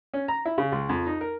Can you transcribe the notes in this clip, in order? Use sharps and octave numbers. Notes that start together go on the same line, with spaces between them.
C#4
A#5
E4
C#3
C#2
F2
D#4
A#4